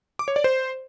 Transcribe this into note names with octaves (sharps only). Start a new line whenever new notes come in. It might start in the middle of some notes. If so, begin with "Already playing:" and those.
D6
C#5
D5
C5